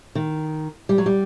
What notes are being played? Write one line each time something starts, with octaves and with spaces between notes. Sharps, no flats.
D#3
G3
F#3
G3